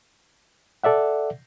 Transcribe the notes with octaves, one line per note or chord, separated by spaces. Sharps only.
A4 D5 E5 F#5